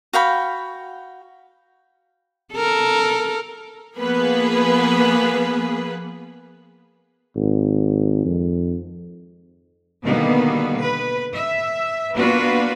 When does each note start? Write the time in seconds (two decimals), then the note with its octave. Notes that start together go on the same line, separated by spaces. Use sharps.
0.13 F#4 F5 G5 B5
2.54 A4 A#4
3.96 F3 A#3 B3 G#4 B4
7.36 G#1
8.25 F2
10.02 B2 D3 D#3 G3 A#3 B3
10.80 B4
11.33 E5
12.14 A#3 B3 D4 F4 F#4 B4